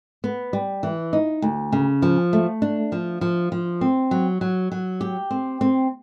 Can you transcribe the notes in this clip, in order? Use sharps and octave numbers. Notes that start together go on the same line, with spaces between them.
B3
G3
E3
D#4
D2
C#3
F3
A3
D4
F3
F3
F3
C4
F#3
F#3
F#3
G4
C4
C4